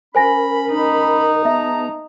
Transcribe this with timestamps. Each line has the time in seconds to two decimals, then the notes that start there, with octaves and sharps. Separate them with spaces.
0.15 C#4 A#4 C5 G#5 B5 A#6
0.72 D#4
1.45 B3 G#4 E5 A5 A#5